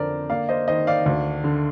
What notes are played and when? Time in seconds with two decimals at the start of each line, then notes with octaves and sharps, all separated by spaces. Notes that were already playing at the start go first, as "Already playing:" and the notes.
Already playing: F2 D3 A#4 C5 D5
0.30 A#3 D5 F5
0.49 C5 D#5
0.68 D#3 C5 D#5
0.87 D5 F5
1.06 D2
1.44 D3